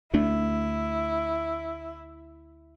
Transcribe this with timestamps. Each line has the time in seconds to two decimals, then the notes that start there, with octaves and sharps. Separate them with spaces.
0.13 D2 A3 D4 E4